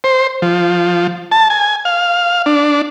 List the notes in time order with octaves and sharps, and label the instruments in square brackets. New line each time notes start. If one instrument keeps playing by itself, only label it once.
[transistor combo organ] C5
F3
A5
G#5
F5
D4